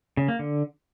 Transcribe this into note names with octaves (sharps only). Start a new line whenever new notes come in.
C#3
A#3
D3